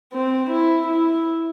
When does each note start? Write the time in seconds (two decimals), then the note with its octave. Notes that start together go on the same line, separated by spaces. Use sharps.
0.13 C4
0.51 E4
0.87 E4